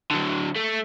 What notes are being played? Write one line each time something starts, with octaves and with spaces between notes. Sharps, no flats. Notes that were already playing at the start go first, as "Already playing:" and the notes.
D3 F#3
A3